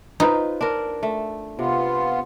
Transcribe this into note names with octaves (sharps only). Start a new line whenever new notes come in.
D#4 F4 B4 C5
D4 F4 A#4
A3
C3 B3 F4